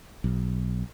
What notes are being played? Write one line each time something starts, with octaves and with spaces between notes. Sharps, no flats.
B1